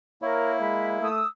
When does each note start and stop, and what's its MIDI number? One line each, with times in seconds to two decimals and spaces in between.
0.22 1.08 58
0.22 1.08 64
0.22 0.52 70
0.22 0.55 73
0.60 0.97 56
0.60 0.89 83
1.01 1.24 57
1.01 1.26 87
1.01 1.26 88